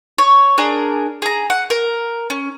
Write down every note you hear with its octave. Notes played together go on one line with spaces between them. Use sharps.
C#5
D4 G#4 A#4
G#4 A#5
F#5
A#4
C#4